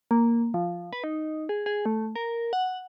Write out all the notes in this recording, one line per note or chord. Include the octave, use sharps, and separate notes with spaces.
A#3
F3
B4
D#4
G#4
G#4
A3
A#4
F#5